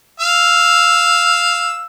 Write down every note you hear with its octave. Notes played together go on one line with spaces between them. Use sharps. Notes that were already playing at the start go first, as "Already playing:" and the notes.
F5 E6